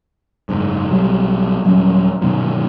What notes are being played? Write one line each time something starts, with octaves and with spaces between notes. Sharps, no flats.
F#1 G#2
B1 F#3 G3
D#1 F#3 G3 C#4
G1 B2 D#3 F#3